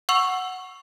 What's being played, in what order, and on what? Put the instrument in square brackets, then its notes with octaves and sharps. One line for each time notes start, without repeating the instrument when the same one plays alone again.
[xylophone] F#5 C#6 E6 F7 F#7